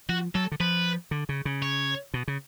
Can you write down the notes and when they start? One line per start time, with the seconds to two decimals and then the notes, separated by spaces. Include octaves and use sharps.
0.09 F3 F#4
0.35 F#3 A4
0.52 D3
0.60 F3 B4
1.11 D3
1.29 C#3
1.45 C#3
1.62 C#5
2.14 B2
2.28 C#3